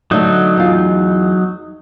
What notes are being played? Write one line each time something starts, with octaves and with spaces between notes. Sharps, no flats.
D3 F#3 A3 D#4
E2 F4